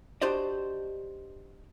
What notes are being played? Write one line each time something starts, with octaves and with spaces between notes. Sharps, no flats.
D4 F#4 G4 C5 D5 D#5